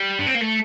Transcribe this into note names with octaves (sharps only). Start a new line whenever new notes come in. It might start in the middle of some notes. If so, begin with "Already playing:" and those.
Already playing: G3
D4
C4
A#3
A3